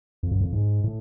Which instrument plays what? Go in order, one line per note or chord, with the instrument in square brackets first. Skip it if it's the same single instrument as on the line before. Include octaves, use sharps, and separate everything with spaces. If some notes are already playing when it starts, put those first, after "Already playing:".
[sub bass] F2
F#2
F2
G#2
A2